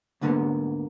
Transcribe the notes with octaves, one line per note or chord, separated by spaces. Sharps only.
D2 G#2 D3 A#3 B3